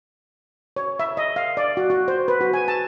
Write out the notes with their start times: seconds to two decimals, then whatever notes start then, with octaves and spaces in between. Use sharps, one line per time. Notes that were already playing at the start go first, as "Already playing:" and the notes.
0.76 C#5
1.00 E5
1.17 D#5
1.36 F5
1.57 D5
1.77 F#4
1.90 F#4
2.08 C5
2.28 B4
2.41 F#4
2.54 G#5
2.68 A5